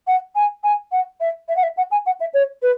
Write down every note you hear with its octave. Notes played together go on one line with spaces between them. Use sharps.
F#5
G#5
G#5
F#5
E5
E5
F#5
E5
F#5
G#5
F#5
E5
C#5
B4